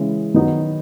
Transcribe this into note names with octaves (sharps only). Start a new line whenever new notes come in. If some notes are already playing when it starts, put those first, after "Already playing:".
Already playing: C#3 E3 G#3
D#3 F#3 B3 D#4 F#4